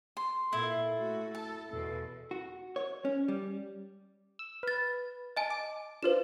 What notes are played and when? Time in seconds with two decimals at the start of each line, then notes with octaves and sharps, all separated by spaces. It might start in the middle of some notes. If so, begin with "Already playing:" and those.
0.17 C6
0.53 A#2 E4 A4
0.95 A3 F#4
1.35 A4 A5
1.71 E2 B2 A4
2.31 F#4
2.76 C#5
3.05 C#4
3.28 G3
4.39 E6
4.63 B4 F6 A6
5.37 D#5 G#5 A5
5.50 D6
6.03 D4 F4 B4 C5 E7